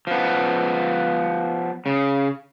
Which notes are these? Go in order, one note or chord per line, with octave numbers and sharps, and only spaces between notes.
F3 B3
C#3